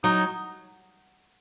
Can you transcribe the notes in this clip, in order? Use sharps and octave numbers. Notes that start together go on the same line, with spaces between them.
F#3 D#4